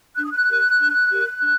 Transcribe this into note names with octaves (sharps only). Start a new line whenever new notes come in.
D4 F#6
D#6
F#6
G4 A#4
D4
G4 A#4
D4